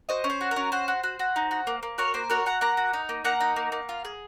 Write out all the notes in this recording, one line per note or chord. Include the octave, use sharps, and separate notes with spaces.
F#4 C5 D#5
C#4
C5
F#4
A#4
C#4
F#4 C5
F#4
F#4
F#4
D#4
F#4
A#3
A#3
F#4 A#4 C#5
A#3 C5
F#4 A#4 C#5
F#4 F#5 A#5
A#3 F#5 A#5
F#4
D#4
A#3
A#3 F#5 A#5
D#4
A#3
A#3
F4
G#4